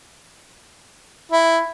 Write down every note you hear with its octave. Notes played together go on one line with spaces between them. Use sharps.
E4